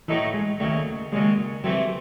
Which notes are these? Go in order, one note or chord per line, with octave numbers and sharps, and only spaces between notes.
A2 E3 F#3 A3 D#4 A4
G#3
D#2 C#3 F#3 A3
D#2 C#3 F#3 G#3
C3 E3 F#3 A3 C4